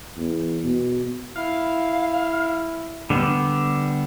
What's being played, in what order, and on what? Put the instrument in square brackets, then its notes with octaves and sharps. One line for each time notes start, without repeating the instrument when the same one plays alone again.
[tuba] E2
B2
[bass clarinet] E4 [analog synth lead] F5
[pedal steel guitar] D3 G3 B3